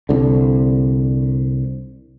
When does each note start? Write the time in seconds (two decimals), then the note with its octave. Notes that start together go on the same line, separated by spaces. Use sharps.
0.09 C2 D3